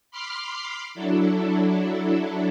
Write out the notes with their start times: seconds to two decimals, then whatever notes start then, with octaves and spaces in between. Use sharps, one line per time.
0.11 B5 C6 D6 F6 C7
0.95 F#3 D4 E4 A4